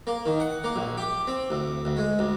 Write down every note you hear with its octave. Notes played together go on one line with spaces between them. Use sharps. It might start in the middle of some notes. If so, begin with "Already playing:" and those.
A#3
D#3
F#5
A#3
A#1
G4
C4
D2
D2
G#3
D2